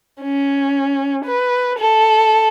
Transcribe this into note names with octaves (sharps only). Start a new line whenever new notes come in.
C#4
B4
A4